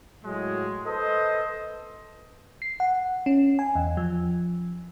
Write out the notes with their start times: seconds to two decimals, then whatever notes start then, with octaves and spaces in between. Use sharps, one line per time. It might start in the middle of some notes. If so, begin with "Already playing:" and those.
0.25 A2 F#3 G#3
0.86 A4 B4 C5 D#5
2.62 C7
2.80 F#5
3.26 C#4
3.59 G#5
3.75 E2
3.97 F3